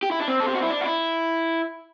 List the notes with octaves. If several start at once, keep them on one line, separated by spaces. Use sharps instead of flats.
G4
E4
D4
C4
A4
G4
F#4
E4
D4
F#4
E4